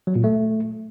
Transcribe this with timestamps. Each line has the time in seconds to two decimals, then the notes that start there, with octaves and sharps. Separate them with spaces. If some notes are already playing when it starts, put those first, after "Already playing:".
0.07 F#3
0.16 A#2
0.24 A3